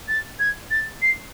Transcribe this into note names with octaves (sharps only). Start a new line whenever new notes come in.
A6
G#6
A6
C7